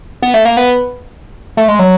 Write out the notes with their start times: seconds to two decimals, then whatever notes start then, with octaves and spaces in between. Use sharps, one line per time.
0.22 B3
0.34 A3
0.45 A#3
0.57 B3
1.57 A3
1.68 G#3
1.79 F#3